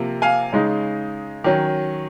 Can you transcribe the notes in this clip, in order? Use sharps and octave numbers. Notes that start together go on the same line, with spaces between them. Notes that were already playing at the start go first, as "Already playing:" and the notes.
Already playing: C3 F3 A#3
F5 G#5
C#3 G#3 D#4
D#3 F#3 C#4